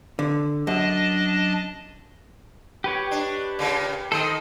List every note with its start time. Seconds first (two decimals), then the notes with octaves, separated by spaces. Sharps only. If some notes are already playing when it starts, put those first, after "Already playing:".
0.19 D3
0.67 F#2 D4 D#5 A5
2.84 G4 B4 C#5
3.11 D4
3.59 A#2 C#3
4.12 D#3 A4 C5 D#5